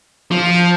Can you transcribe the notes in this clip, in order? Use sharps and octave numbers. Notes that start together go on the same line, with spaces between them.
F3